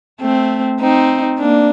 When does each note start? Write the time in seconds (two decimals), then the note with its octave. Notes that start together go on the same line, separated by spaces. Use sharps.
0.20 A3 C4
0.80 C4 D#4
1.39 A#3 D4